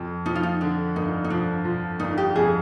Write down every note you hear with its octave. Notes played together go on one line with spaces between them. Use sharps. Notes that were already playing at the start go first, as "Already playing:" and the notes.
Already playing: F2
F3 D#4
F4
D#4
D3 D4
G1 D#4
D#4
F3 D4
F3
G1 D#4
G4
F2 G#4